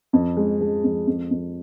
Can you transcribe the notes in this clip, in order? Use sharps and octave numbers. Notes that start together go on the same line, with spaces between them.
F2
G#3
G#3
F2
F2
F2